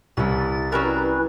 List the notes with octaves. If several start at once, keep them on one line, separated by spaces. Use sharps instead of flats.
C2 E3 C#4 A6
F#3 G3 C#4 E4 A#4 B4